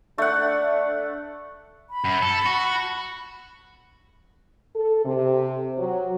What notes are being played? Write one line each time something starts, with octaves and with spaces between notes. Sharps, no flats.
A3 D4 F#5
B5
F#2
A4
F#4
A4
C3
F#3